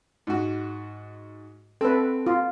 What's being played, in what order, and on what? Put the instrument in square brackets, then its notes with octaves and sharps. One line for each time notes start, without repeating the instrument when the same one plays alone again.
[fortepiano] G#2 F#4
[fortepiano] C4 [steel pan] A4 B4
[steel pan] F4